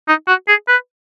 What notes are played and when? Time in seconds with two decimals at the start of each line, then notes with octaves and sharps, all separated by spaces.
0.08 D#4
0.28 F#4
0.48 G#4
0.68 B4